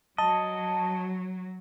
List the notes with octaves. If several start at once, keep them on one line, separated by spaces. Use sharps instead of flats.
F#3 D#5 A5